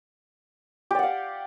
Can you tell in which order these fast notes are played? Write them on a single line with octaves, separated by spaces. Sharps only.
G4 D5 F#5 F5